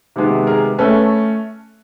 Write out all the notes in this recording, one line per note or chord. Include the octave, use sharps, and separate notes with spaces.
C3 D#3 G#3 B3
G#4 A#4
A3 C#4 A4 B4